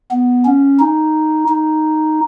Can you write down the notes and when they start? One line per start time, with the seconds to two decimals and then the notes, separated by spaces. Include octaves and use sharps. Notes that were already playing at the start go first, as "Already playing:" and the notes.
0.12 B3
0.45 C#4
0.79 D#4
1.48 D#4